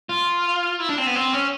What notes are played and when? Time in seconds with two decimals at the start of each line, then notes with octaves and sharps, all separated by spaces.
0.09 F4
0.80 E4
0.89 D4
0.98 C4
1.07 B3
1.15 C4
1.33 C#4